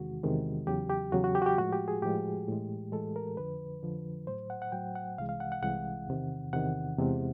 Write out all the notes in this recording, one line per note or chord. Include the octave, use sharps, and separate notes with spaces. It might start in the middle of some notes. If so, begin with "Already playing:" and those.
Already playing: E2 C3 D#3 G#3 F#4
E2 C3 D#3 G#3
E2 C#3 F#3 G4
G4
E2 C#3 F#3 F#4
F#4
G4
F#4
G4
A2 F3 G#3 F#4
G4
G#4
A2 F3 G#3 G4
A2 E3 G#3
A2 E3 G#3 A4
A#4
F2 D3 F3 B4
F2 D3 F3
A2 F#3 C5
F#5
F#5
A2 F#3 G5
F#5
C2 C3 E3 G#3 F5
F5
F#5
F#5
C2 C3 E3 G#3 F#5
E2 C3 D#3
E2 C3 D#3 F#5
E2 C3 E3 G#3